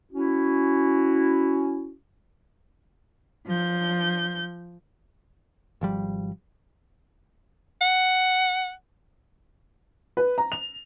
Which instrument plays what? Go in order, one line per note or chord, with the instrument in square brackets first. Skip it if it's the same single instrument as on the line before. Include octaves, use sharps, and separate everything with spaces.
[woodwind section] C#4 E4 F#4
[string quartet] F3 G6
[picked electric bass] G#1 F3 G3
[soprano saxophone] F#5
[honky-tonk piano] B4
A#5
F7